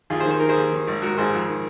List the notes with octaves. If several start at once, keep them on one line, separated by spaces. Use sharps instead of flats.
D#2 F4 G#4
G#4 C5
D#3
C5
D#3 A#4
G#4 C5
D#2
D#3
G#1
G#2 F#4 A#4
G#1 G#4 C5
F2
D#3